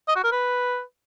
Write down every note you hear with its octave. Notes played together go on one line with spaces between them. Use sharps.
D#5
F#4
A#4
B4